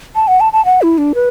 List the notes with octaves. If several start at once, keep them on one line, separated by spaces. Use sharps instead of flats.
A5
F#5
A5
A5
F#5
E4
D4
B4